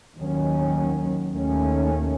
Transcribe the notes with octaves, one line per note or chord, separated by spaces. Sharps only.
D#2 D#3 F#3 C#4
D#2 D#3 A3 C#4